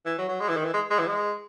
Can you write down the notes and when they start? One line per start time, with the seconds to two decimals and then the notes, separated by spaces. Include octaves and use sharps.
0.06 E3
0.18 F#3
0.29 F#3
0.40 G#3
0.48 E3
0.56 D#3
0.65 E3
0.74 G#3
0.90 G#3
0.99 E3
1.07 G#3